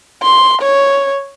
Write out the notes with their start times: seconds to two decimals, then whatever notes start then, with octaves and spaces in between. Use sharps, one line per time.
0.23 C6
0.62 C#5